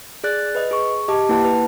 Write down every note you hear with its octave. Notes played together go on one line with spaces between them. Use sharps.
G#4 D5 F#6 A6
B4 D#5
G#4 C#6
G4 D#5 A5 D6
A#3 E4 B4 F#5 A5
B4